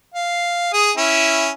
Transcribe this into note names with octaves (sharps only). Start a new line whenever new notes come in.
F5
G#4 D#6
C#4 E4